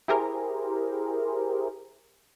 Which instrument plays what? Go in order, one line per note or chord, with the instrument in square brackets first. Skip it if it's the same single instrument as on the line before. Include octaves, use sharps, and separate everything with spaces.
[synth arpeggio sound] E4 G4 G#4 A#4 C5